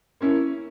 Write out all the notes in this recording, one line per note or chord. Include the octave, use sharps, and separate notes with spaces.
A#3 C#4 E4